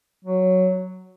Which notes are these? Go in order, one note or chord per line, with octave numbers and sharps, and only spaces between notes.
F#3